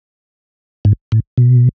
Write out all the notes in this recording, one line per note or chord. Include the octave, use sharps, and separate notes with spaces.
G#2
A2
B2